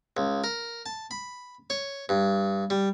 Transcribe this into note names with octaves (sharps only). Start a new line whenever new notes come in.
C#2
A#4
A5
B5
C#5
G2
G3